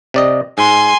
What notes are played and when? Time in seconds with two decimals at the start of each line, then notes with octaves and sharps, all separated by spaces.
0.14 C3 D5 D#5
0.58 G#2 G#5 C6